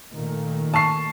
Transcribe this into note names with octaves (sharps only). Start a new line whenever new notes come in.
A#2 D#3 A3
A5 C#6 C7